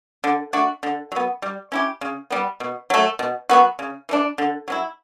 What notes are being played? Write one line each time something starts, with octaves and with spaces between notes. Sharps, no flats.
D3
A3 D4 F#4
D3
F#3 B3
G3
C#4 E4 G4
C#3
G3 B3
B2
F#3 A3
B2
F#3 B3 F#4
C#3
E3 A3 D4
D3
F#3 C#4 E4